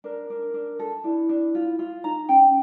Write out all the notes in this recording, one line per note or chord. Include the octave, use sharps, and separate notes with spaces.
D4 A#4
D4
D4
A4
D4 E4
D4
F4
F4
D#4 A#5
C#4 G5